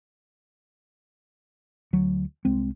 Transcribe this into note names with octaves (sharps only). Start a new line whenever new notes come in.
D2 F#3
C2 G#3 C4